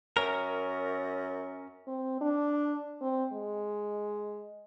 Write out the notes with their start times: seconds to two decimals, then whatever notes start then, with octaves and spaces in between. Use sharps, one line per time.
0.17 F#2 C#4 A#4
1.88 C4
2.21 D4
3.02 C4
3.33 G#3